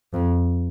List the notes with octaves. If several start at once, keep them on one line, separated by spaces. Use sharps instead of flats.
F2